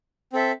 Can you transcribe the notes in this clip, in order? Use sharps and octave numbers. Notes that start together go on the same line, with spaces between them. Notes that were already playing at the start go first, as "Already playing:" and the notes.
C4 A4 E5